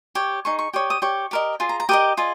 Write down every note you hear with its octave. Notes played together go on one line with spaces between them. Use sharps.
G4 C#5
D#4 G#4 C#6
C#6
G4 C#5 D#6
D#6
G4 C#5 C#6
G4 A#4 D#5
F4 G#4
A#5
A#5
G4 A#4 D#5 D#6
F4 G#4 D#5